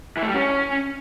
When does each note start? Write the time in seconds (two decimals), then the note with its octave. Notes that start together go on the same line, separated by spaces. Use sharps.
0.17 E3
0.23 A3
0.29 G3
0.34 C#4